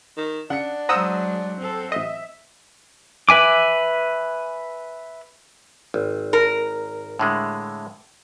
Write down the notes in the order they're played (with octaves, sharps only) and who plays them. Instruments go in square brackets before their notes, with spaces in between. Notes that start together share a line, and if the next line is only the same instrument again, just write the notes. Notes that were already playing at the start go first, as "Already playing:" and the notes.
[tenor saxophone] D#3
[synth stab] C#3 [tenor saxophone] D4 [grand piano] F#5 C#7
[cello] F#3 G#3 [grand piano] C5 F#5 [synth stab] A#5 D#6 E6
[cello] C4 A4
[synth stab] A1 D#5 [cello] E5
[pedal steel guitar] B4 E5 G#5 D6
[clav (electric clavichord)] G#1
[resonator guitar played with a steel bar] A#4
[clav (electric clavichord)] A2 D3 G#3